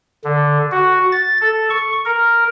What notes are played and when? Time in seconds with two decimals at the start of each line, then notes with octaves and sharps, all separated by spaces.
0.24 D3
0.72 F#4
1.12 A6
1.41 A4
1.70 C#6
2.05 A#4